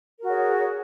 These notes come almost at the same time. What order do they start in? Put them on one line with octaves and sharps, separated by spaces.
A#4 F#4 G#4 C#5